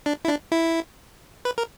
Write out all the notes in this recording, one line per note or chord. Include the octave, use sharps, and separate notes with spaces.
D4
E4
D4
E4
B4
A#4